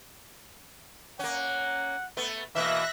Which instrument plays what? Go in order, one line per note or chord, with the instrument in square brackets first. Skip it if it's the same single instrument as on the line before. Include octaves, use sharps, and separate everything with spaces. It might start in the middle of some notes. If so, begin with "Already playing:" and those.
[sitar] A#3 C#4 [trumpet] F#5
[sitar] A3 B3
[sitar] B2 E3 [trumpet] A#3 [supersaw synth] E5 F#6 A#6